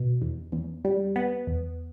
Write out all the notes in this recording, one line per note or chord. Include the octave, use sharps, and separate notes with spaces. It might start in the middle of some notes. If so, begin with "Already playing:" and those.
Already playing: B2
E2
E2
G3
B3
E2